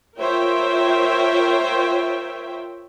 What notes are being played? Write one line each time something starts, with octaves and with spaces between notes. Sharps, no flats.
F4 A#4 C5 C#5 E5 G5